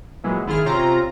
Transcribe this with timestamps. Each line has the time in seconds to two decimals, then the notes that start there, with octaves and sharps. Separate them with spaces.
0.24 A#2 E3 F#3 G#3
0.46 G#1 E4 F4 G#4 F6
0.65 C3 C4 C#4 F4 A#5